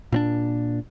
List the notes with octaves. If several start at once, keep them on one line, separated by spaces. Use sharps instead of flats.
A#2 C4 D4